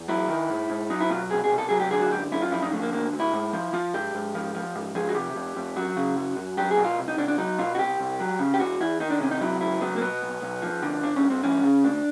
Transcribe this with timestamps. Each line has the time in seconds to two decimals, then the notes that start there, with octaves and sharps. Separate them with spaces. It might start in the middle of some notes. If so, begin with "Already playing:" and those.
Already playing: E2
0.08 F#3 E4
0.28 D#3
0.50 G#2
0.70 G#2
0.90 F#3 D#4
1.01 E4
1.10 B2 F4
1.30 C2 G#4
1.44 G#4
1.51 C2
1.58 A4
1.69 F#3 G#4
1.80 G4
1.91 D3 G#4
2.02 F#4
2.11 F#2 G4
2.31 F#2 E4
2.42 F4
2.52 F3 E4
2.63 D#4
2.72 D3 A3
2.82 A#3
2.92 D2 A#3
3.13 D2
3.20 E4
3.33 G#2
3.53 F3
3.73 F3 F4
3.93 G#2 G4
4.14 G#2
4.35 F3
4.55 F3
4.75 G#2
4.95 F3 G#4
5.09 F#4
5.15 C3 G4
5.36 F2
5.56 F2
5.76 F#3 F#4
5.97 C#3
6.17 F#2
6.37 F#2
6.57 F#3 G4
6.71 G#4
6.77 B2
6.85 F4
6.98 C2
7.08 D#4
7.18 C2 D4
7.28 D4
7.38 F#3 D#4
7.59 B2 F4
7.75 F#4
7.79 C2 G4
8.00 C2
8.20 F#3
8.39 C#3
8.54 G4
8.60 E2 F#4
8.80 E2 E4
9.00 D#3 D#4
9.10 D4
9.20 C3 C#4
9.31 D#4
9.41 F#3 E4
9.61 C#2 E4
9.81 F#3 B3
9.96 A#3
10.01 B2 B3
10.22 B1
10.42 B1
10.62 F3
10.82 D3
11.03 G2 D4
11.16 C#4
11.23 G2
11.30 C4
11.43 E3 C#4
11.64 C#3
11.84 D2 D4